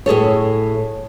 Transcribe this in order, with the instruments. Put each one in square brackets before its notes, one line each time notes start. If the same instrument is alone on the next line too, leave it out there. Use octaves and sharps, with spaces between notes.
[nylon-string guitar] A2 G#4 A4 C#5